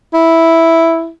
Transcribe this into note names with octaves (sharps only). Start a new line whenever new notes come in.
E4